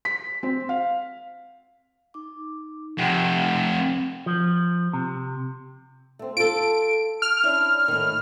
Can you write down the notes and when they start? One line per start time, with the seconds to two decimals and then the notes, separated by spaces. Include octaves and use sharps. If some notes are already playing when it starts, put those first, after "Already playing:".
0.05 B6
0.43 C4
0.69 F5
2.14 D#4 D6
2.98 F2 C3 F#5 G5
4.26 F3
4.93 C3
6.19 A3 C4
6.37 F4 A4 D7
7.22 F6
7.43 C#4 D4 E4
7.88 A2 D#3